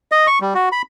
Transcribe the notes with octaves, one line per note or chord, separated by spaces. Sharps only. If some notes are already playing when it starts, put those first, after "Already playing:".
D#5
C#6
G3
F#4
B5